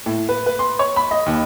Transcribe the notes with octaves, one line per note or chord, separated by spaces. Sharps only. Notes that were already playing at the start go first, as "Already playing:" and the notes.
A2
B4
B4
C6
C#5
B5
D#5
D#2